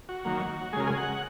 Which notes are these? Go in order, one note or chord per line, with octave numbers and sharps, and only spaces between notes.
F#4
D#3 F#3 A#3
C#3 G#3 G#4 A#4
G#4
F#5